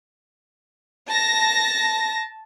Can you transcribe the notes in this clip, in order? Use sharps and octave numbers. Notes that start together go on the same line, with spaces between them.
A5 A#6